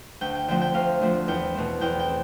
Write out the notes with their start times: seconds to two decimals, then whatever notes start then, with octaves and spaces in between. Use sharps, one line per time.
0.21 D2 G5
0.35 G5
0.48 D3 F3 A3 C4 G5
0.61 G5
0.74 D2 F5
1.01 D3 F3 A3 C4
1.28 E2 G5
1.55 B2 A3 C4
1.81 E2 G5
1.99 G5
2.08 C4